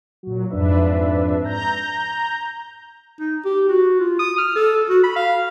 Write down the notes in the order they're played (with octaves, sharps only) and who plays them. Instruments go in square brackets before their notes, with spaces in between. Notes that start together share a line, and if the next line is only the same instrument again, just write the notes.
[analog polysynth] A#2 F#3
F2 G#2 D4 B4 E5
A#5 G6
[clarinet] D#4
G4
F#4
F4
D#6
F6
A4
F#4
B5
F5